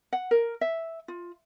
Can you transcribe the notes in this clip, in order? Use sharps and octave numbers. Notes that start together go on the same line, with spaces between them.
F#5
A#4
E5
F4